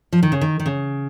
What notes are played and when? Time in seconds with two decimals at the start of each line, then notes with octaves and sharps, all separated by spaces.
0.13 F3
0.23 D#3
0.32 C#3
0.41 D#3
0.60 D#3
0.66 C#3